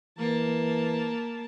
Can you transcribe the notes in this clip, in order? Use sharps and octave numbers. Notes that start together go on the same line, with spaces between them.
E3 A#3 A5